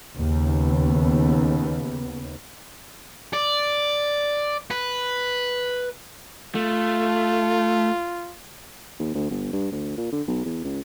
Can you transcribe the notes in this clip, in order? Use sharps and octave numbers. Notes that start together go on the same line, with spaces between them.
D#2 C#3 B3
D5
B4
A3 F4
D#2
D2
G1
G2
D2
A#2
D3
B1
E2
C#2